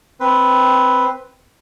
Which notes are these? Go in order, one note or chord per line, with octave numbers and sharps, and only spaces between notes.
C4 B4